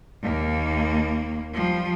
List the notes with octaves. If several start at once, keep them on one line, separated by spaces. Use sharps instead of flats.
D#2 A#3
F3 G3